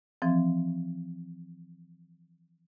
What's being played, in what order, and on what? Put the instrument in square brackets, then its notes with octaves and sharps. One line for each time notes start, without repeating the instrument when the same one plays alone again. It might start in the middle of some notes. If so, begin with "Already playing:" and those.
[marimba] E3 F3 C4